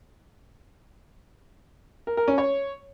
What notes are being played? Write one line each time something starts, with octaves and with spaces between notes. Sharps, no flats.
A#4
A#4
C#4
C#5